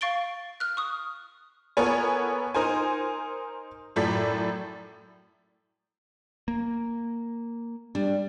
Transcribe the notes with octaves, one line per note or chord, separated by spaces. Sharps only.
F5 C#6 A6 D7 G7
F6 F#6
C#6 D#6
B3 A4 A#4 C#5 G#5
D#4 A#4 C5 G#5
F#2 A2 A4 D5 B6
A#3
G3 D4